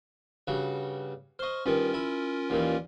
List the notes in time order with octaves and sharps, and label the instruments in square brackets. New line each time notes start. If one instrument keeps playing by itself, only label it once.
[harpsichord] G2 C#3 F#4
[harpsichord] C5 D#5 [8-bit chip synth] C#6 F6
[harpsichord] G2 D#3 [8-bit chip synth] C#4 F4 A#4
[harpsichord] E4
D#2 A#2 E3